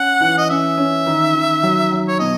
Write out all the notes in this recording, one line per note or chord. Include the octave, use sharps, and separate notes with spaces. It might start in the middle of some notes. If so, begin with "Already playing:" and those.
Already playing: C#4 F#5
E3
D#5
C#4 E5
C#4
D#3
D#3
F#3
F#3
C#5
B2 D#5